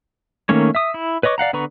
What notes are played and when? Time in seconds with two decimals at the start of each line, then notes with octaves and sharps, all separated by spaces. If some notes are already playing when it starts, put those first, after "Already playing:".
0.49 D#3 A3 A#3 C#4 C#5
0.75 E5 D#6
0.94 E4
1.23 B4 C#5 D#5 C#6 D6
1.38 D5 F5 F#5 A#5
1.53 D3 B3 B4 A#5 C#6